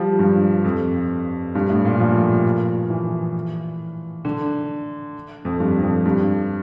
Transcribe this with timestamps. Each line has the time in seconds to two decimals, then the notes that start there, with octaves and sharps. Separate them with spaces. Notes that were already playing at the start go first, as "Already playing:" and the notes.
Already playing: F3 G3
0.19 G2
0.65 F2
1.55 G2
1.69 A2
1.85 A#2
1.99 F3
2.90 E3
4.25 D3
5.45 F2
5.60 G2
5.82 F2
6.05 G2